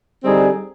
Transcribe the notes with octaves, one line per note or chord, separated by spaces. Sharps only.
D3 G3 C4 D#4 G#4